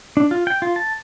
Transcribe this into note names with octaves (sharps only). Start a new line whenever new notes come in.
D4
F4
G5
F4
A5